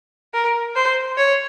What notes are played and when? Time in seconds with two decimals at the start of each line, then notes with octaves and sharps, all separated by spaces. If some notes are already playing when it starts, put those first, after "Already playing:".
0.34 A#4
0.76 C5
1.17 C#5